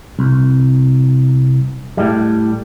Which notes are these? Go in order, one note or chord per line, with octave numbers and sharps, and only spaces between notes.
C2
A2 G3